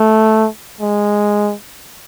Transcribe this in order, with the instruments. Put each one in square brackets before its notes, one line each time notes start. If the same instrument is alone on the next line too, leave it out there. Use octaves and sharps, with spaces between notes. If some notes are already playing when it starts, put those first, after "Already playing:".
Already playing: [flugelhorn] A3
G#3